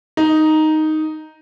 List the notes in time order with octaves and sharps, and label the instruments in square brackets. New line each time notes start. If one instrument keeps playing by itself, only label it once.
[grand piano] D#4